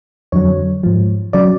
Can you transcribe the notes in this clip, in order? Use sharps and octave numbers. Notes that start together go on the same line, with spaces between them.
F2 D3 F#3 C#5
G#2 F3
C#3 F#3 D5